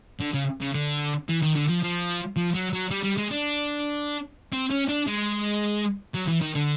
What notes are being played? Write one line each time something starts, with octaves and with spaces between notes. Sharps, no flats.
D3
C#3
C#3
D3
E3
D#3
D3
F3
F3
F3
F#3
F#3
G3
G3
G#3
D4
C4
C#4
D4
G#3
F#3
E3
D#3
D3